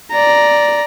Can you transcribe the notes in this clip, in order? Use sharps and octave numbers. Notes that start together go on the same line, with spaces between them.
D5 A#5